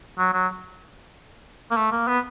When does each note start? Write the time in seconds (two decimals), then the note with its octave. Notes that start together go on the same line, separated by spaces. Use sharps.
0.18 F#3
0.33 F#3
1.71 A#3
1.76 A3
1.92 A#3
2.08 B3